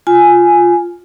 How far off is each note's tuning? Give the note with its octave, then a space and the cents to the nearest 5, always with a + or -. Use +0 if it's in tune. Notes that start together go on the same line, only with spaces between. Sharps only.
F4 +0 G#5 +0